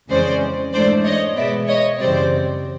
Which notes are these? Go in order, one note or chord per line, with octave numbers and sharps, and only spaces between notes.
F2 C#3 E3 G#3 C#4 C5 D5
G#2 E3 A3 D4 C5 D5
C#5 D#5
B2 G#3 B3 D5 E5
C#5 D#5
F#2 C#3 E3 G3 C4 C5 D5